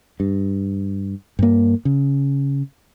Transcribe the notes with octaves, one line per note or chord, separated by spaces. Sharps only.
G2
G2 A#3
C#3